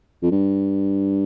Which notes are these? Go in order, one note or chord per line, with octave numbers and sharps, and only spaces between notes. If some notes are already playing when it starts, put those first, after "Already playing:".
F2
G2